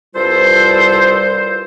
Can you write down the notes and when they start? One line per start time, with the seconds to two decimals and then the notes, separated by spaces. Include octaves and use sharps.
0.15 C2 G2 G3 F4 A4 C5